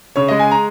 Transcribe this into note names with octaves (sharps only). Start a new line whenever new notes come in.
C#3 C#5
G#3 D#5
G#5
A#5